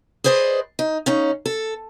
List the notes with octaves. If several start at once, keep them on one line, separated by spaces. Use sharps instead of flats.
G#4 B4 C5 D5 D#5
D#4
C#3 C#4 D#4
A4